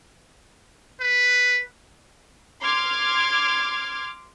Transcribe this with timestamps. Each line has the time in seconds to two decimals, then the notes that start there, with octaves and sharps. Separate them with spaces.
1.00 B4
2.61 C6 D6 F6 G#6